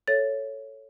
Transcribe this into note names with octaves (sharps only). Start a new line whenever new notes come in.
A4 C#5 E5 A6